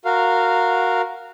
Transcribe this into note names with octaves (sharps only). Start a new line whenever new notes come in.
F#4 A#4 F5